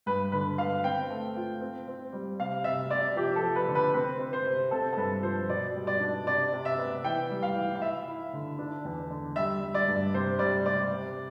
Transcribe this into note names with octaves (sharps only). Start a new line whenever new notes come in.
G2 B4
D3 B4
B3 F5
C4 G5
A3
F4
C4
C4
G3
C3 F5
C3 E5
C3 D5
F3 G4
A4
F3
B4
D3
B4
C4 B4
C4
C5
C3
C4 A4
A4
G2 B4
F3 C5
B2 D5
G3
D5
D4
C3 D5
C3
E5
B3
E3 G5
G3
F5
E3
F5
E4 E5
E4
D3
D4
E2
D3
G3 E5
G3
D5
G2
C3 C5
G3 D5
C3 D5
C3